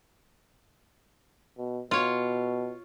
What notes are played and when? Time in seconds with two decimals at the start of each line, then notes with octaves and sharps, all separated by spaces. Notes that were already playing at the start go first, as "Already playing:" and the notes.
1.58 B2
1.91 B2 F4 C#5